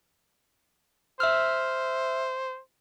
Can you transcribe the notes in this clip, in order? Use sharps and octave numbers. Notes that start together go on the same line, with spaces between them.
C5 E5 E6 F6